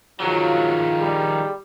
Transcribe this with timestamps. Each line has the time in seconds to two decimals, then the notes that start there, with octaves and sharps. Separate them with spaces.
0.20 D#3 F3 F#3 F4 G#4
1.00 G3